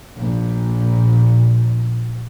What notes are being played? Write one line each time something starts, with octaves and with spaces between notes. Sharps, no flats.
A#1 A#2